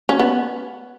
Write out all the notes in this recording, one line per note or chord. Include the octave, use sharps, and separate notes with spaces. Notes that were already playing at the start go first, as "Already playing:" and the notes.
C#4
B3